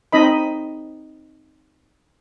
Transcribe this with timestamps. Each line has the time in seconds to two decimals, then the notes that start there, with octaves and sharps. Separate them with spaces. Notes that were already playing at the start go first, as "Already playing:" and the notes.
0.12 C4 D#4 D#5 B5